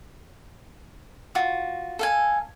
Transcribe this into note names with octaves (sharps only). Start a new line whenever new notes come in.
F4 F#4
A4 F5 G#5